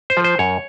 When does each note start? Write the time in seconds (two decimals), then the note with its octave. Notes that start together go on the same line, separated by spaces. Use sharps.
0.10 C5
0.17 F3
0.24 C5
0.39 F#2 C#5